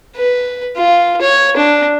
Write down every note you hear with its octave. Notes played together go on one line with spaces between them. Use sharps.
B4
F4
C#5
D4